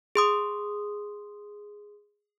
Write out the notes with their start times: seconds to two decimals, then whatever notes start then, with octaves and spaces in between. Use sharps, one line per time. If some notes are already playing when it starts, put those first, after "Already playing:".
0.15 G#4 C6 D#6